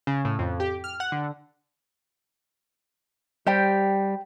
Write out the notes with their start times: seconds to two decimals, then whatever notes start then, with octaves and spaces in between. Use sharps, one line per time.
0.07 C#3
0.25 A2
0.39 F2
0.60 G4
0.84 F6
1.00 F#5
1.12 D3
3.47 G3 G4 C5 G5